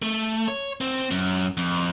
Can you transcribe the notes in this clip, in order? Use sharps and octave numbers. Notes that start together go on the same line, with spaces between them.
A3
C#5
C4
F#2
F2